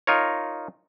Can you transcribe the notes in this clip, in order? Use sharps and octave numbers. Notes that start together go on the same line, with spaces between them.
D#4 F4 A#4 C#5